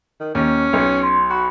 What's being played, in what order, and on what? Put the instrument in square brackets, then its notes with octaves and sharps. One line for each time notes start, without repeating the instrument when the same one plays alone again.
[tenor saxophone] D#3
[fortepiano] D#2 [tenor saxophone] C#4
[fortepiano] B1
[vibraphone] C6
[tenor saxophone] F#4 [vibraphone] B5